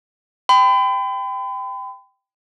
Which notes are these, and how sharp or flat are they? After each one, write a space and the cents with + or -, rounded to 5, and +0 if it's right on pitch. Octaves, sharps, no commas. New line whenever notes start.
G5 +5 B5 +40